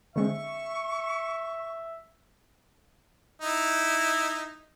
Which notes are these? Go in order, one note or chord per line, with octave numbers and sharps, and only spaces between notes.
D3 G#3 C4 E5 C#6
D#4 E4